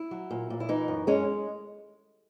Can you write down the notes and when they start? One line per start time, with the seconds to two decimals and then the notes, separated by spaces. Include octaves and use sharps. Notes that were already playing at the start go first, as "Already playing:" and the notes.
Already playing: E4
0.11 F#3
0.31 A#2
0.50 A#2
0.60 E4
0.69 E3 D#4
0.88 F#2
1.07 G#3 C#4